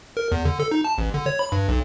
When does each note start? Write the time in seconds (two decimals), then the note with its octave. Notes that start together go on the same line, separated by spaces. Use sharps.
0.17 A#4
0.32 E2
0.45 D3
0.60 A4
0.71 D#4
0.85 A5
0.98 A1
1.14 D3
1.26 C#5
1.39 B5
1.52 G2
1.68 B1